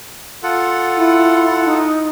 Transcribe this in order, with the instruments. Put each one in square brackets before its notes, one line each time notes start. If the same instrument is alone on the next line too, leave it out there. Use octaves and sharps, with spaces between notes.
[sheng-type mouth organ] F4 A4 F#5
[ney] E4
D#4